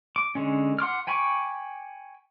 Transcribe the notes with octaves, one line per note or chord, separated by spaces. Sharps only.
D6
D3 G#3 C#4
F#5 C6 D6 F6
G5 G#5 B5 C#6 D6